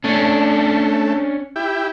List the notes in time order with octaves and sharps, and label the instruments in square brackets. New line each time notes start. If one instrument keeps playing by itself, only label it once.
[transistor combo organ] A3 [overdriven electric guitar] C#4 D4
[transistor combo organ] E4 G4